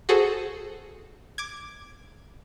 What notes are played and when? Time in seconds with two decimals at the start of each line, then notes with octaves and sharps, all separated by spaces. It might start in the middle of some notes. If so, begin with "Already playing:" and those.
0.09 F#4 G#4 A4 C5
1.38 D6 G#6